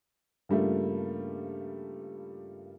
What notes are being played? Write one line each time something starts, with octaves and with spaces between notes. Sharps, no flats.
G2 C#3 G3 A3 A#3 F4